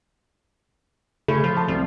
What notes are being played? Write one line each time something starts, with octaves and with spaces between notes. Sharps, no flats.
C#3 A3 B5
F3
A5
C2 F3